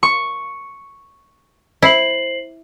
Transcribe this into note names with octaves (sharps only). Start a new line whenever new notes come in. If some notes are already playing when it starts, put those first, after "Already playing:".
C#6
E4 C5 C7 F#7